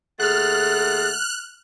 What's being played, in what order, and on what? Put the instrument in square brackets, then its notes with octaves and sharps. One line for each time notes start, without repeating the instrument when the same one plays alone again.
[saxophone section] D#2 A3 F#5 [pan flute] G#4 [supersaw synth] F6 F#6 [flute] A6